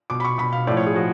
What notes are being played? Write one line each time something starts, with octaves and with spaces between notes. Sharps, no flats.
B2 D6
B5
C#6
B2 B5
F5
A2 F3 D5
C#5
G#4
F3 F#4